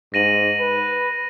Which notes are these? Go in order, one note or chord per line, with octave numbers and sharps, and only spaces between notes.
G#2 A#6 D#7 F#7
B4